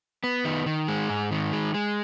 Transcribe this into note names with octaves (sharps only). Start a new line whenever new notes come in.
B3
D#3
D#3
G#3
G#2
D#3
G#3
G#3